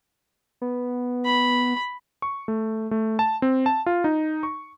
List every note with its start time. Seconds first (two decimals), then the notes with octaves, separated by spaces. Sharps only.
0.62 B3
1.25 B5
2.22 C#6
2.48 A3
2.91 A3
3.19 A5
3.42 C4
3.66 A5
3.86 F4
4.04 D#4
4.43 C#6